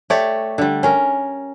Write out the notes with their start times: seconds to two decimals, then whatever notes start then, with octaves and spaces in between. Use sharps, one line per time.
0.10 A3 G4 C#5 D5
0.58 D3 G3
0.83 C#4 A#4